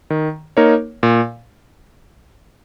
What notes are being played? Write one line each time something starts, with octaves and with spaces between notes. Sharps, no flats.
D#3
A#3 D#4 A#4 C#5
A#2